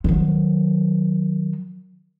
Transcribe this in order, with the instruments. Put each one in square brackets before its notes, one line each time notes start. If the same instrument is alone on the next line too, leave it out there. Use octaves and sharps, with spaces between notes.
[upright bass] D#3 F#3